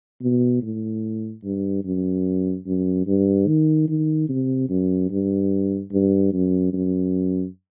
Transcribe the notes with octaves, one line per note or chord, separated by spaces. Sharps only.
B2
A2
G2
F#2
F#2
G2
D#3
D#3
C3
F#2
G2
G2
F#2
F#2